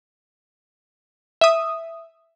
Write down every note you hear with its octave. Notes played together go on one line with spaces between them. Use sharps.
E5 D#6